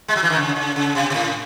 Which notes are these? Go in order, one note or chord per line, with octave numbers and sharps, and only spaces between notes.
G#3
F#3
E3
D#3
C#3
C#3
C#3
C3
C3
A2